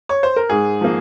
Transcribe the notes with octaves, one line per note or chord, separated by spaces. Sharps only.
C#5
C5
A#4
G#2 G#4
F3 A#3